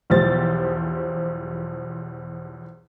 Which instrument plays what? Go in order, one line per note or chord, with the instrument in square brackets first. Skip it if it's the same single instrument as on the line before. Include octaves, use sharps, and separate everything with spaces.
[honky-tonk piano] B1 E2 F3 G4 C5 A6